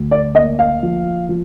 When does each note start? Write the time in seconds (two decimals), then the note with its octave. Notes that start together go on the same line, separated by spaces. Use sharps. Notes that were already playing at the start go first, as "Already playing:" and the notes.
Already playing: D2
0.11 D5
0.35 A#3 D#5
0.59 F5
0.83 F3
1.29 F3